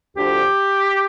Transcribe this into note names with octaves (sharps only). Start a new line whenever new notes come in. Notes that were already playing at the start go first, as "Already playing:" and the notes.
D2 D3 F3 G4